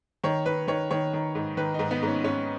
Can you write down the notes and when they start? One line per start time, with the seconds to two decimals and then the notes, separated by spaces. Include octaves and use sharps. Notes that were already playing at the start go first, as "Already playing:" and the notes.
0.24 D#3 C#5
0.46 D#3 B4
0.68 D#3 C#5
0.91 D#3 C#5
1.13 D#3
1.35 G#2
1.57 D#3 B4
1.74 G#2 D#4
1.91 B3
2.03 G#2
2.08 C#4
2.24 G#2 C#4